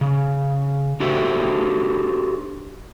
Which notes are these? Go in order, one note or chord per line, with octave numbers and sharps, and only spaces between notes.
C#3
D4 F#4 G4 A4 C5 E5